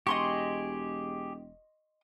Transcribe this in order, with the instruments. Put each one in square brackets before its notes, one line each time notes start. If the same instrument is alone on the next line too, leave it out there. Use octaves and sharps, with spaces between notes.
[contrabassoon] E1 [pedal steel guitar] G4 G#4 [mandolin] D#5 C6 C#6